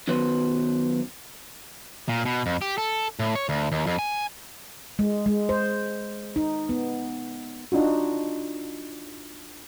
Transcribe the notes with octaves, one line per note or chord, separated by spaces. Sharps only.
F#2 D#3 F#3 B3 B4 C5
A#2
B2
F2
G4
A4
A2
C#5
D2
D#2
F2
G#5
G#3
G#3
C5
D#4
B3
D4 D#4 F4 F#4